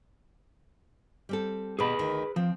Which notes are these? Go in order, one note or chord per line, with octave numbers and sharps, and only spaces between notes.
G3 C4 A4
B2 G4 G#4 B4 B5
D2 D#3
F3 C4